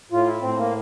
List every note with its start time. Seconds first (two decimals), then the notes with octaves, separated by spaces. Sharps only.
0.11 A2 F4
0.27 E4
0.41 A2 C4
0.57 A#3